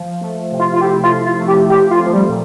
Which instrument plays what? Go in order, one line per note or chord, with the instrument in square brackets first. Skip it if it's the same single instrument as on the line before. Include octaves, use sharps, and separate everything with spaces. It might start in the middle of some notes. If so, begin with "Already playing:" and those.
Already playing: [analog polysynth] F3
A3
C3
[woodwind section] F4
F4
[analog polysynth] E4 [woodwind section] G4
[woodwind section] F4
[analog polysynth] F3
[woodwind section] F4
[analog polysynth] A3
[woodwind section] G4
[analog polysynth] F3 [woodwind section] G4
[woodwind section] F4
[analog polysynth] C4
[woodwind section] F3
G3
[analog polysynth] A#2